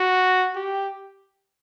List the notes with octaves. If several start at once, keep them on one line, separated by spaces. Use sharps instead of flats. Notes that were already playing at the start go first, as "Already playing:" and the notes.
Already playing: F#4
G4